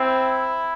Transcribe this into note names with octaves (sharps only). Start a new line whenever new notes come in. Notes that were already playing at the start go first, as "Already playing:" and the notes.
Already playing: C4 E4